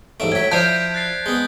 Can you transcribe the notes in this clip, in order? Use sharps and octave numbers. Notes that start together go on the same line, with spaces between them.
A1 G#2 A3 D7
A2 F#3 G#6 B6
F3 E4 C5 D5 A5 G6 C7
F#6 A6 C7
G#3 B3